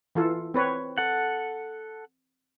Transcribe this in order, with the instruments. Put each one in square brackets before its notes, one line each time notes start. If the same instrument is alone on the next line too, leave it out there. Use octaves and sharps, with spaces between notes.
[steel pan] E3 F4 A4
C4 B4 C#5
[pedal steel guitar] A4 F#5